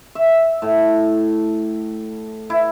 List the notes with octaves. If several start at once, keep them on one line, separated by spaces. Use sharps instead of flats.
E5
A2
E4